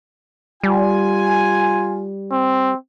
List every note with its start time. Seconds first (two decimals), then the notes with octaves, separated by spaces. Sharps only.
0.63 G3 F4 G#5
2.31 C4